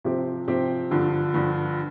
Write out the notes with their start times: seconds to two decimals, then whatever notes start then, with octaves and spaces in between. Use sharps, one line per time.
0.05 C3 F3 C4 G4
0.48 C3 F3 C4 G4
0.91 G2 D3 F3
1.34 G2 D3 F3